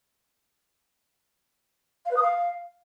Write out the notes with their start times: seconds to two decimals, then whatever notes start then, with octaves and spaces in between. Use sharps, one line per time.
2.06 F5
2.11 B4
2.16 D#6
2.22 F5